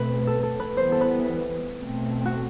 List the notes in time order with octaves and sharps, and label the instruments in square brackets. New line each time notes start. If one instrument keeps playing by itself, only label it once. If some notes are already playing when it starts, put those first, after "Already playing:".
Already playing: [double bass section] B2 A3 C4 [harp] B4
[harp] A4
A4
B4
[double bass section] E3 G3 B3 [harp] C5
[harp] A4
B4
[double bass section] B2 A3 C4
[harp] F#4